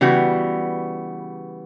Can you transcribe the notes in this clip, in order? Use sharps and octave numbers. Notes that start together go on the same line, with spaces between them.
C#3 E3 G3 B3 F#4